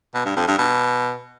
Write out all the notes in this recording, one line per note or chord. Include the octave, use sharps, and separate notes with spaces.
B2
G2
F2
G2
B2